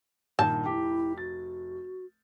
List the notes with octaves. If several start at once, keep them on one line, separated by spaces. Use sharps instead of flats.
A#1 G2 A#2 D#3 A5 G6
F1 E4 G4
F#4 A6